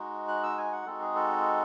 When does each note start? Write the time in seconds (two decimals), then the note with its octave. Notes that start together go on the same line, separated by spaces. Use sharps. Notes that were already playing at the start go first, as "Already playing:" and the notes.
Already playing: G#3 D#4 F#4
0.28 F#6
0.43 E6
0.58 G#5
0.72 F#5
0.86 G#3 C4 D#4 F#4 A4
1.01 G#4
1.16 A4